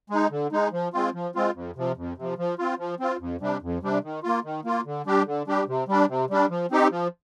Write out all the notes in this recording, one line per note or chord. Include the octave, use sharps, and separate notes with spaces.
G#3 D#4
D3
G#3 D#4
F3
G#3 C4 F4
F3
G#3 C4 F4
F2
C3 F3
F2
C3 F3
F3
C4 F4
F3
C4 F4
F2
C3 G3 D4
F2
C3 G3 D4
D#3
A#3 F4
D#3
A#3 F4
D3
G3 D4 G4
D3
G3 D4 G4
C3
G3 D4
C3
G3 D4
F3
C4 D#4 G4
F3